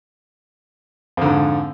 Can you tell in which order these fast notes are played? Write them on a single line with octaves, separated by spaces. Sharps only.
F2 D3 G#2